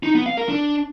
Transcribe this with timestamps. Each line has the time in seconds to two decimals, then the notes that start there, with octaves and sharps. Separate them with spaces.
0.03 D#4
0.15 B3
0.26 F5
0.37 A#4
0.49 D4